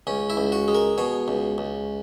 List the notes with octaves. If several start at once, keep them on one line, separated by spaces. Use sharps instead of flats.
C#2 C#4
E4
C#2
F#4
G#3
A#4
B2 C#5
C#2
C#2